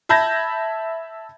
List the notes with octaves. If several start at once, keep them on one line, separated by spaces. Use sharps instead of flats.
E5 A5 B5 G6 G#6 A#6